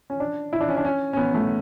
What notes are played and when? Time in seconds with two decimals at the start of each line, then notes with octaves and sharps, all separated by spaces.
0.10 C#4
0.20 D4
0.53 E4
0.61 D4
0.69 C#4
0.77 D4
0.85 C#4
1.13 C#4
1.17 B3
1.34 A3